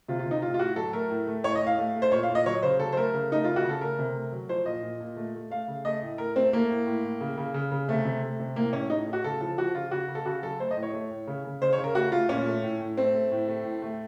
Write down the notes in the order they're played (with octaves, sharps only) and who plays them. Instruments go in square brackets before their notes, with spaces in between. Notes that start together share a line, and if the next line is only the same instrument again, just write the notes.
[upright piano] C3 F4
F4
C3
D#4
A2 F4
F4
A2 F#4
F#3 A4
A3 A#4
A2
A3
A2 C#5
D#5
A2
F5
A3
A3
C5
A#2 C#5
F5
A#2
D#5
F#3 C#5
C#3 C5
F#3 A4
C5
A3 A#4
C#3
A3 D#4
C#3 F4
F#4
C#3 A4
A3 A#4
C3
A3
F#3
F3 C5
A#2 D#5
A#2
A#2
A3
A3
A3 F5
C#3
A3 D#5
A2
A2 A#4
A3 C4
A3 A#3
A2
A2
A2
C#3
C#3
C#3
C#3
C3 A3
C3
A3
C3
A2 A#3
A2 C#4
A2 D#4
A3
F#4
C#3 A4
F3 A4
F3 F#4
C#3 F4
C#3 F#4
C#3
A4
C#3 F#4
F#3 A4
A3 C5
D#5
A2
C#5
A3
A2
C#3
C#3
C#3 C5
C#5
C#3
A#4
A3 F#4
A3 F4
A#2 C#4
A3
A2
A2
A3 C4
A3
A2
A3
A2
A3